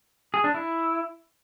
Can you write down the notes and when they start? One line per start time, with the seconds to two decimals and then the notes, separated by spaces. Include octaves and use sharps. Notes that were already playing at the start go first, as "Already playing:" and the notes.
0.34 G#4
0.44 D4
0.54 E4